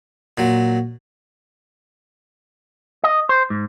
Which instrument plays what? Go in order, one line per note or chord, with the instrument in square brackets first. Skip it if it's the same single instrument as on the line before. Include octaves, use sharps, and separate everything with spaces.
[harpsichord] A#2 F#3
[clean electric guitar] D#5
C5
G#2